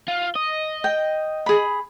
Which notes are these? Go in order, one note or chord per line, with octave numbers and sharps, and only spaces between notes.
F4
D#5
G5
G#4 B5